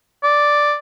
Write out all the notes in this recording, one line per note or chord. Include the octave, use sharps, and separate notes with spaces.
D5